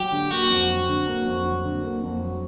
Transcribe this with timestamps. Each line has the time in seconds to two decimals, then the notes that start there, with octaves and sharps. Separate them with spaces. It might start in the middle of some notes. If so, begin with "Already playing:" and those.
Already playing: F#3 G4
0.12 D3
0.31 A#3 F#4
0.50 F2
0.69 F#3
0.89 D3
1.07 A#3
1.26 F2
1.45 F#3
1.64 D3
1.83 A#3
2.02 F2
2.21 F#3